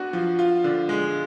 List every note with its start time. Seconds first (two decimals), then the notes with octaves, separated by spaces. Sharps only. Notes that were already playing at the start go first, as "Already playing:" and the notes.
Already playing: B3 D4 F#4
0.13 F3
0.39 F4
0.64 D3
0.89 G#3